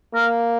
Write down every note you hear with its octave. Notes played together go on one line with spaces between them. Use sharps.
A#3 A#4